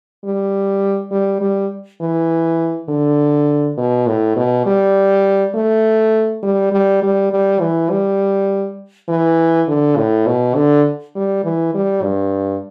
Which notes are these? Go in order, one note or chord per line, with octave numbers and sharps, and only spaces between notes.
G3
G3
G3
E3
D3
B2
A2
B2
G3
A3
G3
G3
G3
G3
E3
G3
E3
D3
A2
B2
D3
G3
E3
G3
G2